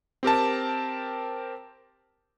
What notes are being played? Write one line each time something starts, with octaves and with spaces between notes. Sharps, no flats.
C4 G4 A#4 A5